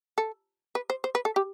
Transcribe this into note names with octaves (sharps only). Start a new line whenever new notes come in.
A4
B4
C5
C5
B4
A4
G4